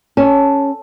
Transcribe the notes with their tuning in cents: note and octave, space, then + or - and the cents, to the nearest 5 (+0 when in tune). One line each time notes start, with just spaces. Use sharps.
C#4 +0 A4 +0 A5 +0